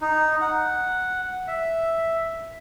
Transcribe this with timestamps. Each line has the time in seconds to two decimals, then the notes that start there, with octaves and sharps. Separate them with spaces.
0.01 D#4
0.41 F#5
1.48 E5